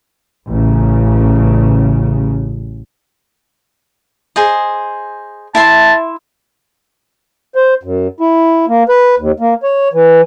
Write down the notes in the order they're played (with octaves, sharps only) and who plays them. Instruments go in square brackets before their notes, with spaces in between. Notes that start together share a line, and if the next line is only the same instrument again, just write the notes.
[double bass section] A1 C#3
[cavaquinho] G#4 C5 D#5
[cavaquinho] E4 E5 C6 [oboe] A5
[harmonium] C5
F#2
E4
A#3
B4
D#2
A#3
C#5
E3